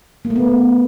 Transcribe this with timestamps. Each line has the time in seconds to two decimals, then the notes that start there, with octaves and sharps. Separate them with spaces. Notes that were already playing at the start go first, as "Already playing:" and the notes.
0.25 A#3
0.30 A3
0.36 B3